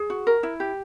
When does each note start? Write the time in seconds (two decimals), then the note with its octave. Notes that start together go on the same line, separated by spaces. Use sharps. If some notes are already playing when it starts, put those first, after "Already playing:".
Already playing: G#4
0.10 F#4
0.27 A#4
0.43 E4
0.60 G4